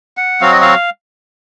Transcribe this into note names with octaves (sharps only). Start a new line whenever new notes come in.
F#5
F#3 C4 F#4 F5
D#5
F5